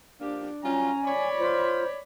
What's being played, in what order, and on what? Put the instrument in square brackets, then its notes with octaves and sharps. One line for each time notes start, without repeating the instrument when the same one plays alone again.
[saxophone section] F3 A#3 G4 [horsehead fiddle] D4
[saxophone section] F#3 G3 F4 [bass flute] C#4 [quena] G#5 [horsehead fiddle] A#5
[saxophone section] C#5 [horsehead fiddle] D5 B5
[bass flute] F4 [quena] C5